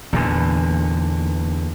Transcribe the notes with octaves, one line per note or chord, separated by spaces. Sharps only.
E2 A#2 D3